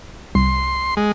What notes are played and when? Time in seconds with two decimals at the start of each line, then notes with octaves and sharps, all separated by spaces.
0.35 C2 C6
0.97 G#3